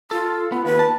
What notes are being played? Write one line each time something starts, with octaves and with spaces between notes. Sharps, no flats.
F4 A4
B3 F4
D#2 B4
A5